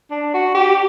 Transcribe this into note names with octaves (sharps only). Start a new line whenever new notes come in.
D4
F#4
G4